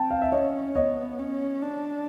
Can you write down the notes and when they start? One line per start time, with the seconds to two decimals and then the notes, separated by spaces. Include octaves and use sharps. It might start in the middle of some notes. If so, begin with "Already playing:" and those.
Already playing: C4 G5 A5
0.11 F5
0.22 E5
0.32 C#4 C#5 D#5
0.75 B3 C#5 D#5
1.19 C#4
1.63 D4